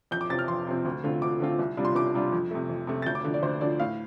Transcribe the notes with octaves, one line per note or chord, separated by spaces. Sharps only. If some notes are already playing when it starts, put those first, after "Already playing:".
F2 G6
D6
C3 F3 C4 A6
F6
F2 C6
C3 F3 C4
D2
D3 A3 C4 F4
D2 D6
D3 A3 C4 F4
C2
C3 G3 D4 F4
C6
C2 D6
C3 G3 D4 F4
F2
C3 A3
F2
C3 A3
A6
D2 G6
D6
D3 F3
D5
D2 C5
D3 F3 D5
A2 F5